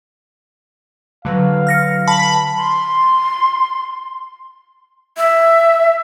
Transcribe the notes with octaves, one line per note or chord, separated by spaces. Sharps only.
D3 F#3 B4 F5
F6 A#6 C#7
A5 B5
C6
E5